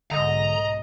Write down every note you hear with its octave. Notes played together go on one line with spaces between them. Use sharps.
B1 G#2 D3 D#5 A#5